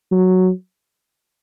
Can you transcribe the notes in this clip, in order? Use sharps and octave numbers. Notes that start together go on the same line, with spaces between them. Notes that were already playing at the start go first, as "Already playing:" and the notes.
F#3